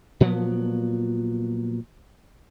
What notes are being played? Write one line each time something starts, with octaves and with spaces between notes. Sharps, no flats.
A#2 F3 F#3 B3